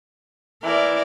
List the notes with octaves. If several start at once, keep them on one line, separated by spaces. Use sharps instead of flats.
E3 A#4 D5